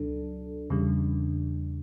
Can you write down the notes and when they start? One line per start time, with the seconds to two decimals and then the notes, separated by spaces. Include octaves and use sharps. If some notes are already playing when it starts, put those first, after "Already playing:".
Already playing: C#2 B2 F#3 D4 A4
0.70 E2 C#3 G3